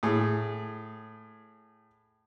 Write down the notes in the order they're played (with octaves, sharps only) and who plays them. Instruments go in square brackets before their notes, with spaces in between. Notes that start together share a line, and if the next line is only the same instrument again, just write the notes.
[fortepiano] A2 G#4